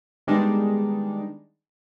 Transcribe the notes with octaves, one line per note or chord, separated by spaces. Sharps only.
D#3 G3 G#3 B3 D4 D#4